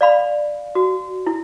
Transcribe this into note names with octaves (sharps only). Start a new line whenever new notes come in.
D5 F5 B5
F#4
E4